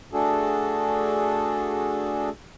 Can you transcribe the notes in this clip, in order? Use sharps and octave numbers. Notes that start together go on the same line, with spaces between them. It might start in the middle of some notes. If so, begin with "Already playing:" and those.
A3 D4 F#4 G#4 A4